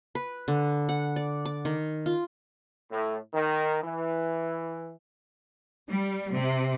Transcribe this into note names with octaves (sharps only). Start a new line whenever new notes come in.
B4
D3
F#5
D5
D6
D#3
F4
A2
D#3
E3
G3
C3